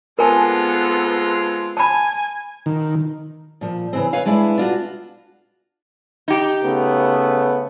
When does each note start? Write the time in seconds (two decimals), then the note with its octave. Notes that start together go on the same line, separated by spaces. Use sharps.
0.19 G#3 B3 C4 F4 A4 A#4 G#5 A5
1.77 G#5 A5 B5
2.66 D#3
3.61 A#2 F3
3.93 C#3 E3 C4
4.13 B4 C#5 F5
4.26 G#3 D4 E4 B4
4.58 D4 F4 F#4
6.28 D#4 G4
6.63 C#3 A3 B3